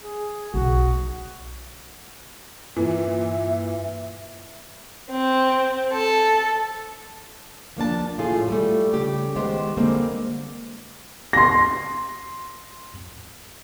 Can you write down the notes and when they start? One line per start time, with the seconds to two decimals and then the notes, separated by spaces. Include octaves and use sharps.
0.01 G#4
0.54 B1 F#4
2.76 G2 A#2 E3 E5
5.11 C4
5.93 A4
7.77 F3 A#3 D4 A5
8.18 A2 F4 G#4
8.48 G3 A3
8.93 C#3 G4
9.36 D#3 G#3 B3 G4 C5
9.77 D3 G3 G#3 A#3 C4
11.33 C6 A#6